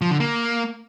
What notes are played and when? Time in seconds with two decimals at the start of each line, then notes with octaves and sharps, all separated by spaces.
0.01 F3
0.11 D3
0.20 A#3